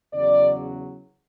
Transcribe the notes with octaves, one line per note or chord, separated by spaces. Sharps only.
E2 C#3 F#3 D5